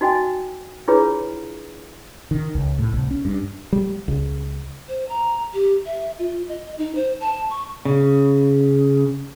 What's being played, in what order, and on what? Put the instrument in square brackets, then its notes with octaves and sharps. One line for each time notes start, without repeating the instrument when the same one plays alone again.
[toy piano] D#4 F#4 D#5 G5 G#5
D4 E4 F4 G#4 B4 C#5
[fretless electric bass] D#3
C#2
A2
C2
C#4
G2
[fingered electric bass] G3
C#2
[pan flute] C5
A#5
G4
E5
F4
D#5
D#4
C5
A5
C#6
[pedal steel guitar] C#3